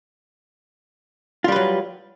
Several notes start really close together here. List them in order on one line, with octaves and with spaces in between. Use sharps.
F4 G3 B4 F#3